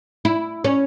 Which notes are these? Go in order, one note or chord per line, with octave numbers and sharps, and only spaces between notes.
E4
C#4